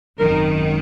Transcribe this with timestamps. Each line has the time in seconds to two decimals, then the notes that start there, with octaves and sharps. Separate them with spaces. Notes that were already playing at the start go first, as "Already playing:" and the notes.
0.19 G#1 F#2 D#3 A#4